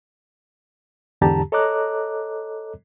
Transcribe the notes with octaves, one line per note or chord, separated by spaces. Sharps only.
E2 G#2 D3 G4 A5 A#5
A4 C#5 D#5 A#5 D6 F#6